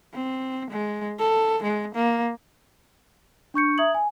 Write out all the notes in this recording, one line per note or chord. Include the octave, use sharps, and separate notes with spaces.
C4
G#3
A4
G#3
A#3
D4 C#6 G6 C#7
E5 A#5 D#6 G#6 F#7
G#5